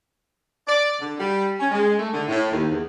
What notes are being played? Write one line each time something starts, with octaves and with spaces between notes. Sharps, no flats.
D5
D3
G3
C#4
G#3
A3
D3
A2
D#2
E2